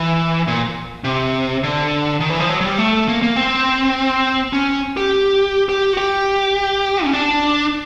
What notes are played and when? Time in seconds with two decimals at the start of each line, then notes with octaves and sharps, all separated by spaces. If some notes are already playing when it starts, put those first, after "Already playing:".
Already playing: E3
0.47 A#2
1.04 C3
1.63 D3
2.20 D#3
2.30 E3
2.40 F3
2.50 F#3
2.61 F#3
2.64 G3
2.78 A3
3.08 A#3
3.22 A#3
3.36 C4
4.53 C#4
4.97 G4
5.69 G4
5.93 F#4
5.97 G4
7.04 C#4
7.13 D4